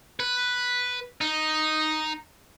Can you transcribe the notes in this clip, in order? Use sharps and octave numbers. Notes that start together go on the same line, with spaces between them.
B4
D#4